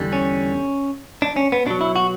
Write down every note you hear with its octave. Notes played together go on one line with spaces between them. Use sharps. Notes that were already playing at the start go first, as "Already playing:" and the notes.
Already playing: E2 D3 G3
C#4
D4
C#4
B3
B2 F#3 D4
E4
F#4